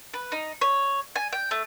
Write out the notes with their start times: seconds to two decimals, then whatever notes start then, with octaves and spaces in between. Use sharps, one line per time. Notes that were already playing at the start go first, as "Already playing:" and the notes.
0.14 B4
0.32 D#4
0.61 C#5
1.16 G#5
1.33 G5
1.51 A3